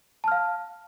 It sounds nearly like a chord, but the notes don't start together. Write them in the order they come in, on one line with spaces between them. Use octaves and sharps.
A5 F6 F5